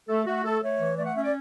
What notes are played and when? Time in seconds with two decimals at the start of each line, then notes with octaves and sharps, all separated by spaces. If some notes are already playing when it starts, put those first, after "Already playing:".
0.08 A3 A4
0.26 A3 F#4
0.44 A3 A4
0.62 A3 C#5
0.79 E3
0.97 A3 D5
1.06 F#5
1.15 C#4 E5
1.24 D5